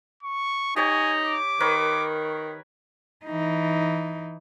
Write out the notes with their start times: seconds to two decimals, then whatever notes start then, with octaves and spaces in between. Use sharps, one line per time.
0.23 C#6
0.76 D#4 G4 C#5 G#5
1.22 D6
1.60 D#3 A#4 B4 C#5
3.26 E3 D#4